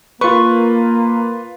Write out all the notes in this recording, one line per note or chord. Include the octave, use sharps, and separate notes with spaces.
A#3 F4 B4 C#6